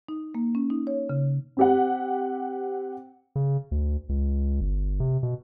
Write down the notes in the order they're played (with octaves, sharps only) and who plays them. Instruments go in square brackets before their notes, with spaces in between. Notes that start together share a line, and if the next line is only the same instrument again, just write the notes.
[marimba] D#4
A#3
C#4
D#4
C#5
C#3
[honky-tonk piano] C4 G4 F#5
[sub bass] C#3
D2
C#2
G1
C3
B2